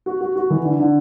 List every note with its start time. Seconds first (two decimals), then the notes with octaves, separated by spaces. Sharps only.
0.06 F#4
0.21 F#4
0.36 F#4
0.50 E3
0.65 D3
0.80 D3